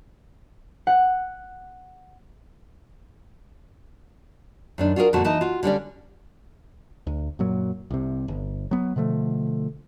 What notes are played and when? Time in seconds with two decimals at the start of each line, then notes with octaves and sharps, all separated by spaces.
0.87 F#5
4.78 F#2 D#3 D4
4.96 F4 F#4 G#4 A#4
5.13 F2 A#2 D3 A3 F#4 A5
5.24 E3 D#4 D#5 A5
5.41 F4 F#4
5.63 D3 G3 C#4 D5
7.07 D2
7.39 F#2 A#2 F#3
7.91 C2 C3
8.28 G1
8.71 F#3 B3
8.96 B2 D3 F3 A3